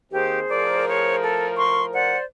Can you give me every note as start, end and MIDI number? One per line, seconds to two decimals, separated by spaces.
0.12 0.42 51
0.12 0.42 58
0.12 0.42 60
0.12 0.40 67
0.12 1.23 68
0.12 1.23 72
0.49 2.16 45
0.49 2.16 53
0.49 2.16 70
0.49 0.86 74
0.88 1.16 73
1.23 1.47 69
1.57 1.86 84
1.57 1.81 85
1.94 2.24 72
1.94 2.24 74
1.94 2.17 78